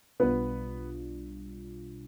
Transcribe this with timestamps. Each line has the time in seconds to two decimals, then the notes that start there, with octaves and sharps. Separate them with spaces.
0.20 B1 B2 G3 B3 D4 F4 B4